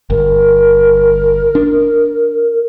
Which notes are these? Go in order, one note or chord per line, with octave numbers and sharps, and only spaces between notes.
G1 A#4
D4